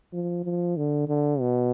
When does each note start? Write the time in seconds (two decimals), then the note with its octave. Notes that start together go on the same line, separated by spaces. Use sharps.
0.13 F3
0.44 F3
0.77 D3
1.08 D3
1.40 B2